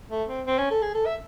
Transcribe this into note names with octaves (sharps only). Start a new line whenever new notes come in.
A3
C4
C4
C#4
A4
G#4
A4
E5